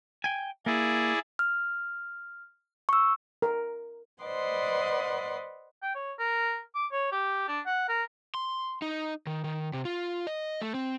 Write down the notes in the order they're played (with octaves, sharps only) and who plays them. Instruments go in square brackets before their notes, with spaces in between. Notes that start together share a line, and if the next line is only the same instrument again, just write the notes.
[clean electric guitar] G5 G#5
[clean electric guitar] A#3 [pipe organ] E4 G#4 D5
[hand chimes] F6
C#6 E6
[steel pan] A#4
[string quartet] B4 C5 D5 D#5 F#5 C6
[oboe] G5
C#5
A#4
D6
C#5
G4
D4
F#5
A#4
[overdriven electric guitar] C6
D#4
D#3
D#3
C3
F4
D#5
A3
C4